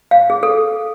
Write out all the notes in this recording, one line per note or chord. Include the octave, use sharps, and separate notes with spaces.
F5
G#4
A4